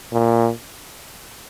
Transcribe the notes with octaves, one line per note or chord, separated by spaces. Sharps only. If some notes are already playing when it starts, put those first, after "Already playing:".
A#2